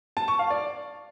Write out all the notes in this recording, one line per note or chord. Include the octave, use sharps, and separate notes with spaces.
A5
C#6
F5
D5